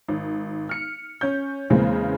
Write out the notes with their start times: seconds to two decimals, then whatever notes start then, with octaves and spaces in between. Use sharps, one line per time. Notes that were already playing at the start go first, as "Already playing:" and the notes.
0.08 G#1
0.69 F6 C#7
1.21 C#4 G6
1.70 E2 C#3 G#3 A#3 C4